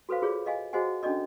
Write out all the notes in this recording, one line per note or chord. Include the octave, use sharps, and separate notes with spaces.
F#4 A4 B4 C5 F5
F4 G#4 C#5 D5
D#5 F5 G#5
F#4 G#4 C5 D#5 F#5 G#5
C#4 D4 F#4 A4 D5 D#5